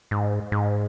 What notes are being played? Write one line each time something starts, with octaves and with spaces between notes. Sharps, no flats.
G#2
G#2